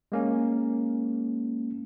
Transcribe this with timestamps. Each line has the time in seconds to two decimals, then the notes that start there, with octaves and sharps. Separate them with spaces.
0.12 G#3 A#3 C#4